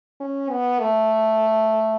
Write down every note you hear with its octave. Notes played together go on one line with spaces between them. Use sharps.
C#4
B3
A3